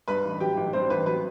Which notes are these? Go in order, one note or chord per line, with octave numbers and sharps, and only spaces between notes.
G2 B4 B5
A1
F#3 G4 G5
A1
G2 C4 C5
A1 B4
F#3 B4